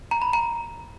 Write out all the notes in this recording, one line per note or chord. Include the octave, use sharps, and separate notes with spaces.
A#5
B5
A#5